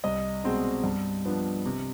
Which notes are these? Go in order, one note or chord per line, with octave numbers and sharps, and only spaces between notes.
C2 D#5
B2 G#3 C4
G2
F3 B3 D4
C3